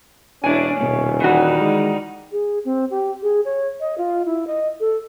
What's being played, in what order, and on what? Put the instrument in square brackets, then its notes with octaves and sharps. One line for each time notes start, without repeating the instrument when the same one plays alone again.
[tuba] E1 [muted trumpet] C#4 [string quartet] D4 E4 [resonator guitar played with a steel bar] G#5
[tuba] D#1 [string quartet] B2
[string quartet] D#3 G3 D#4 [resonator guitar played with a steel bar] E3 F#4
[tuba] G#3
[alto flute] G#4
C4
G4
G#4
C#5
D#5
F4
E4
D#5
A4